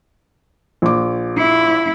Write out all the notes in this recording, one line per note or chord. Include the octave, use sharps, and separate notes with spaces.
A#1 D6
E4